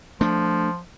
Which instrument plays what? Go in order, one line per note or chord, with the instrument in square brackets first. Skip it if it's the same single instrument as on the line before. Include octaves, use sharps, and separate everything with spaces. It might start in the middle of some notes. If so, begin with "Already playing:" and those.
[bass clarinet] F3 [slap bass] A3 D4